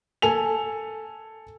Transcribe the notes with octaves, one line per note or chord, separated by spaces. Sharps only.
A4 G#5 F7